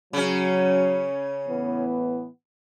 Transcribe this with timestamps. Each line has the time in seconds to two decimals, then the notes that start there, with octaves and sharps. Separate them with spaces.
0.13 C#3 F#3 C#4
1.49 A2 E3 B3